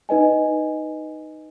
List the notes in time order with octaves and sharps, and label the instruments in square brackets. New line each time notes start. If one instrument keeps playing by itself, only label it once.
[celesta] D#4 B4 D#5 G#5